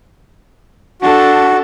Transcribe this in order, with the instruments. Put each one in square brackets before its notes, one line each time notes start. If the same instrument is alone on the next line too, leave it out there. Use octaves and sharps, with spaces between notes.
[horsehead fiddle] D4 A4 [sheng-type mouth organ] F#4